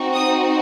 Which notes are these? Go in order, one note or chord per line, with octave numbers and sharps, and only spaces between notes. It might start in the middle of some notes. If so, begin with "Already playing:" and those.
Already playing: C4 D#4 F#4
D#6